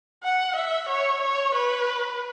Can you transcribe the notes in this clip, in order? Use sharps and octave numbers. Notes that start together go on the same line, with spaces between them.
F#5
E5
C#5
C#5
B4